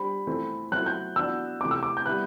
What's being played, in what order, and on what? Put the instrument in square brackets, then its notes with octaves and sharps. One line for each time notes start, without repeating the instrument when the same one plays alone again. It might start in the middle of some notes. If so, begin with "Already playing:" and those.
Already playing: [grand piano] G3 D4 G4 C5 [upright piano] B5
[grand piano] E3 A3 C4
[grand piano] F#3 A3 C4 E4 [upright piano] F#6
[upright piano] G6
[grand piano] E3 B3 D4 F#4 [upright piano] E6
[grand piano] C3 E3 A3 [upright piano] D6
[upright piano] E6
D6
G6
[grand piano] G3 B3 E4 B4 [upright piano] F#6